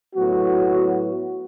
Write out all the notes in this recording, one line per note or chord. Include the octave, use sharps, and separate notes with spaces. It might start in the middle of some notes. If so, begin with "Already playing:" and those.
A2 F#3 B3 F#4